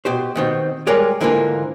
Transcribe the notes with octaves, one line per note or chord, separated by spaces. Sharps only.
B2 G4 C5
B2 D#3 C4
G3 G#3 A#4 C#5 D5
G#2 D3 E3 A#3 D4 F4